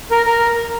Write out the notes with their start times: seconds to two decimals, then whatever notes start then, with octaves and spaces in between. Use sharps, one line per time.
0.11 A#4
0.26 A#4